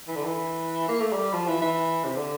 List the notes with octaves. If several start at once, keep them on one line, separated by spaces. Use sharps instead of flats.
E3
D3
E3
A#3
A3
G3
F3
E3
E3
C3
D3